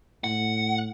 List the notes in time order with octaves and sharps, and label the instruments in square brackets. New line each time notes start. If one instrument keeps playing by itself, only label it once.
[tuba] A2 [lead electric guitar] F#5